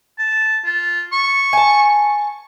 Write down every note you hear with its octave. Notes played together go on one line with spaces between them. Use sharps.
A5
F4
C#6
G#5 A5